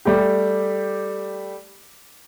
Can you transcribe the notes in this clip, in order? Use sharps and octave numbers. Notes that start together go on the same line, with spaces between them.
G3 A3 G4